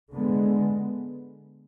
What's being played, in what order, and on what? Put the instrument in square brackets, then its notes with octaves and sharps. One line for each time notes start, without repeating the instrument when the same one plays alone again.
[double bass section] D3 G#3 B3